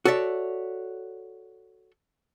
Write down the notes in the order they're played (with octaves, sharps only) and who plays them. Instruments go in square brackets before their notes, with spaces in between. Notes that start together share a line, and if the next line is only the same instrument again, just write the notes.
[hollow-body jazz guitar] F#4 A4 C#5 D5 E5